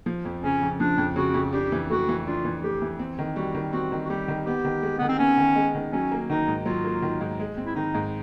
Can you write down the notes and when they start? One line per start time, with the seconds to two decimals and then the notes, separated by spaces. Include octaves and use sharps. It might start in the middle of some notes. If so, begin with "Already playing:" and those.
0.06 F3
0.25 F2
0.43 C#3 C#4
0.62 F2
0.80 F3 D4
0.98 F2
1.16 C#3 F#4
1.34 F2
1.53 D4 G4
1.72 E3
1.90 A3 F#4
2.09 E3
2.26 D4 F4
2.45 E3
2.63 A3 G4
2.82 E3
2.99 C4
3.19 D#3
3.36 G3 F#4
3.55 D#3
3.73 C4 F#4
3.92 D#3
4.05 F#4
4.09 G3 G4
4.28 D#3
4.46 B3 G4
4.65 D#3
4.83 G#3
4.99 D#3 B3
5.08 C4
5.19 B3 C#4
5.38 D#3
5.56 G#3
5.75 D#3
5.92 F#3 C#4
6.11 A#3
6.29 D#3 D#4
6.48 G#2
6.66 F#3 F4
6.84 A#3
7.02 D#3
7.21 G#2
7.40 G#3
7.57 C4
7.66 E4
7.76 D#3 D#4
7.94 G#2